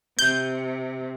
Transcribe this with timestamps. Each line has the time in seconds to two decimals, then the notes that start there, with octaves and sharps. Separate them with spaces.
0.19 C3 G6